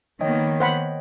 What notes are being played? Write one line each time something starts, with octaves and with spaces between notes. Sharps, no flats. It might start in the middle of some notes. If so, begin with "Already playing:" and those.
D#3 A#3 B3 C#5 D#5 G5
C5 F#5 B5